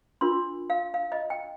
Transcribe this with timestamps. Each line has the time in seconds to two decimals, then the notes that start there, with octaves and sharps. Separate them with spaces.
0.21 D4 F4 A#4 C6
0.70 F5
0.94 F5
1.12 D#5
1.30 G5